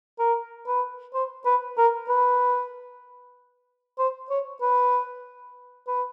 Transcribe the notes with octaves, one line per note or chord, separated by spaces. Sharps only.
A#4
B4
C5
B4
A#4
B4
C5
C#5
B4
B4